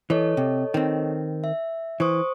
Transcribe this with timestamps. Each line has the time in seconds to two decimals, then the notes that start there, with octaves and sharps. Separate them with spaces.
0.10 E3 A4 C#5 D#5
0.37 C3
0.74 D#3 C4
1.44 E5
2.00 E3 C5 C#6 D#6